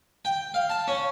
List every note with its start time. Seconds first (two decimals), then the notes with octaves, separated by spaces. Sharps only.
0.25 G5
0.54 F5
0.70 A5
0.88 C#4